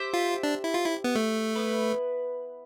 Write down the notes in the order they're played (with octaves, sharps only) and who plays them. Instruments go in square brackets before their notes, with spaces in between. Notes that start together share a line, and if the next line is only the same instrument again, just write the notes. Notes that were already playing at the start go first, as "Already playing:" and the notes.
Already playing: [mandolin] G4 C5 E5
[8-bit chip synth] F4
D4
E4
F4
E4
B3
A3
[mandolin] B3 E4 B4